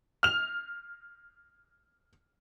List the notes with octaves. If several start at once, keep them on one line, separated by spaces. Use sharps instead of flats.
F6 F7